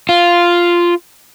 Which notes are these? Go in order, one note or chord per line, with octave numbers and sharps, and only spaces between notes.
F4